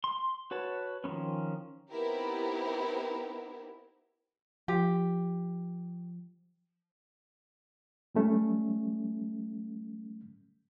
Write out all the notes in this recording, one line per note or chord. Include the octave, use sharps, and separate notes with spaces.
C6
F#4 B4 C#5 A5
D#3 F3 G3 B3 C#4
B3 C4 D#4 E4 G4 A#4
F3 G4
F#3 G3 A3 C#4